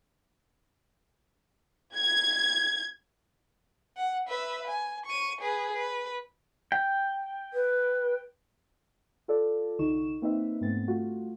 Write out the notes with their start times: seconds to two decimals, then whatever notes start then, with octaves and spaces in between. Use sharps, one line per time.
1.97 G#6
3.97 F#5
4.28 B4 E5
4.67 G#5
5.06 C#6 D#7
5.41 G#4 B4
5.76 B4
6.72 G5
7.54 B4
9.28 F4 A4 D5
9.79 C2 D3 D#4 C#6 E7
10.22 A#3 C4 D#4 B4 E5
10.61 G#2 A3 B3 C4 A6
10.88 G3 A3 F4 F#4